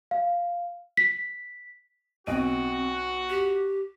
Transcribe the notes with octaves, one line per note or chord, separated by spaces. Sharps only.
F5
B6
B1 C4 F#4 D#5 D#7
G4